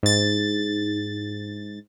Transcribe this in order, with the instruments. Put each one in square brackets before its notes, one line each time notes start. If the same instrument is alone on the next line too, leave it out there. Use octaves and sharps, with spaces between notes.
[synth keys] G#2 A6